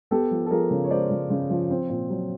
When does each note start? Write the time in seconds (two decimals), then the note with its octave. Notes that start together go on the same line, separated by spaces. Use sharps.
0.11 B3 G4 A4
0.31 F3
0.46 A4
0.51 F3 G#4 A#4
0.71 C#3
0.84 C#5
0.90 G#3 C5 D5
1.10 C#3
1.30 C#3
1.50 F3
1.70 C4
1.89 A#2
2.10 F#3